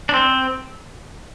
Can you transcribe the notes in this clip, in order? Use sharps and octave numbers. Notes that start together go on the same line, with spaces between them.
D4
C4